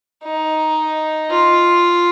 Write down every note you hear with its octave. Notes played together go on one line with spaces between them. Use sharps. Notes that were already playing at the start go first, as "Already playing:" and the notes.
D#4
F4